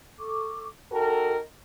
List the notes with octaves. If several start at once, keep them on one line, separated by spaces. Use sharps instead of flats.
A4 C#6 D6
D#4 F#4 A4 A#4 G5 A5